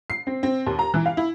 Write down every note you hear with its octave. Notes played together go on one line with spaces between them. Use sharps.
C7
C4
C4
D#2
A#5
E3
F5
E4